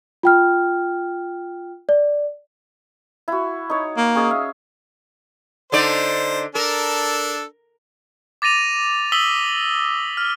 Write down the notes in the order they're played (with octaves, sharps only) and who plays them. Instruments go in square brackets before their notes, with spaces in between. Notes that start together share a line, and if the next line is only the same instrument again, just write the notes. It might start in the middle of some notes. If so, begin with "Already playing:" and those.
[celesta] F4 G5 F6
D5
[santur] E4 F#4
D#4 C#5
[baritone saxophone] A#3
[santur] C#4 G#4 D#5
E5 F5
[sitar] D3 D#4 D5 [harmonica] C5
[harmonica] D4 A4 [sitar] A#4
[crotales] D6 A6 A#6 D#7 F7
D#6 E6 B6 F#7 G7
F6